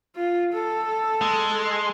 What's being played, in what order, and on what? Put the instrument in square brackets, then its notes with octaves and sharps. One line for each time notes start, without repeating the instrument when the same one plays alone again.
[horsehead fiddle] F4
A4
[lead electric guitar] G#3
[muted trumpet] C6